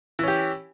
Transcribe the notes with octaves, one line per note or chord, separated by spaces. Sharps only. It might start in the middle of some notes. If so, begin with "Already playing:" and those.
E3 C#4 G4